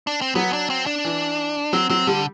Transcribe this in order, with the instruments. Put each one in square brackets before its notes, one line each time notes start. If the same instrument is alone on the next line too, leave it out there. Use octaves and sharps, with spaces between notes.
[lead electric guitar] D4
C4
[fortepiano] F#3 [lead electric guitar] B3
[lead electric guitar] D4
C4
D4
[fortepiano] E3
[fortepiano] F#3 [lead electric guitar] C4
[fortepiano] F#3 [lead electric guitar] C4
[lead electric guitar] D3 [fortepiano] G3